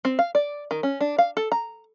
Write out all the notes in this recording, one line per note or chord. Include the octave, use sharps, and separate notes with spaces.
C4
F5
D5
D#3
C#4
D4
F5
A4
A#5